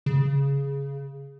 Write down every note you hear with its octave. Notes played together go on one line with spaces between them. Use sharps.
C#3